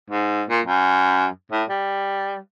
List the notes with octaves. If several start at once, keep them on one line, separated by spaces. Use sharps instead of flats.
G#2
A#2
F#2
A2
G3